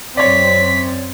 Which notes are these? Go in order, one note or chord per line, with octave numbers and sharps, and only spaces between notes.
F#2 C4 C#5 D5 B6